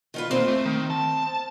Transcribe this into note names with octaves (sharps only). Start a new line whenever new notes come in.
D#3 F4 B4
E2 A#3 C4
A3
D#3
A5